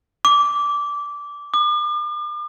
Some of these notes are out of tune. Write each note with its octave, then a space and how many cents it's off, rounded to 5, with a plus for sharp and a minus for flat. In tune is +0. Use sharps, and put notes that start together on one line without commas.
D6 -15
D6 +40